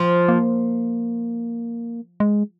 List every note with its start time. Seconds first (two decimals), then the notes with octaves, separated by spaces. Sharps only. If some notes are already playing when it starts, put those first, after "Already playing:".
Already playing: F3
0.28 A#3
2.20 G#3